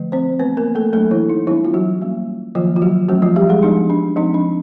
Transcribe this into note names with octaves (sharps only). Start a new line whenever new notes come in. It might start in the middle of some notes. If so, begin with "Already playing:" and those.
Already playing: D3 F3 A3
C4 C5
E3 A3 B3 C4 B4
A#3 A#4
A3 A4
F#3 A3 A#3 D4 A4
E3 E4
D#4
E3 G3 B3 D4 E4
F4
F#3 F#4
G3 A#3 C#4
D#3 F3 F#3 A#3 F4
F4
F#3 F#4
E3 F#3 A3 C#4 F#4
F3 F4
G3 G4
G#3 G#4
F3 G#3 B3 D4 D#4
D4
F3 G#3 C4 D#4
D4